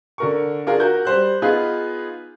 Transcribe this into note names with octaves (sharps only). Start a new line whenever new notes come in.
D3 A#4 C#6
D4 F4 G#4 A#4
F#4 A#4 G6
G3 C5 F#6
B3 D#4 F4 G#4 B4